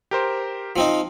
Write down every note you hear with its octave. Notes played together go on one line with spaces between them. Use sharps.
G4 A#4 C5
F3 C4 D#4